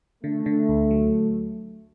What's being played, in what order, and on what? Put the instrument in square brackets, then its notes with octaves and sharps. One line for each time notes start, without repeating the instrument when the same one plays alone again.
[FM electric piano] D3 [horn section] A3
[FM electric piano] D3
D2
F#3